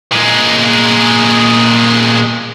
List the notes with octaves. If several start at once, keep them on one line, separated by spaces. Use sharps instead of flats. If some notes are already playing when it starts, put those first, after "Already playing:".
A#2 G#3